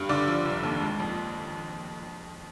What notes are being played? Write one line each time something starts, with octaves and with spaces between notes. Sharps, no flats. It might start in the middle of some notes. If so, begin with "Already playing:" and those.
Already playing: G2
D3 D5
F3
F1
D#2
G#3
F2